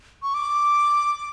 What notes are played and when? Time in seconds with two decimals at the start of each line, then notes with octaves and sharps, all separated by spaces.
0.23 C#6
0.34 D6